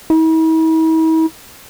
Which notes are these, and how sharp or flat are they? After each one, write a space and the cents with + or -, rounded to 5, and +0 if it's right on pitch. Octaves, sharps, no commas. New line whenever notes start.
E4 -45